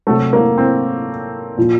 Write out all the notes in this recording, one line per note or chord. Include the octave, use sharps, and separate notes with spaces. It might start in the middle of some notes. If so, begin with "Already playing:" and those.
C3 F#3 A3
A#3
C4
A#2 F3